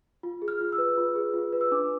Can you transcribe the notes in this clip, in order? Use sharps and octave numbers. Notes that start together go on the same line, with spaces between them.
F4
G#4
F6
F4
E6
B4
F4
G#4
F4
B4
E6
D4 D6